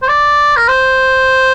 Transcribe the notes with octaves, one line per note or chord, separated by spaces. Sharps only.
C5
D5
A#4
C5